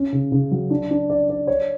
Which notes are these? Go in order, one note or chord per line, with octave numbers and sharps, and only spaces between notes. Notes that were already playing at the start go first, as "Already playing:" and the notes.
Already playing: C#4
C#3
C#3
F#3
D4
D4
D5
D5
C#5